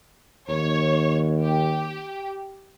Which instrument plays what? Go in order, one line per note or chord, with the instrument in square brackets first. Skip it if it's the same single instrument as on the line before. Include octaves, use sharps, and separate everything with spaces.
[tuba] D#2 [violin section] C#5
[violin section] G4